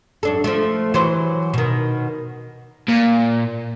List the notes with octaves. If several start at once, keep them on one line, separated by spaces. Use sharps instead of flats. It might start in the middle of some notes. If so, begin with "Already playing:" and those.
F#2 D4 A4
F3 A3
E3 F#3 C5
B2 D#3
A#2